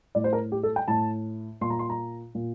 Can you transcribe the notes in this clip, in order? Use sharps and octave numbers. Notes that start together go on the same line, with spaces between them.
A2 D5
C5
A#4
G4
A4
G5
A2 A5
A#2 C6
A#5
C6
A#5
A#2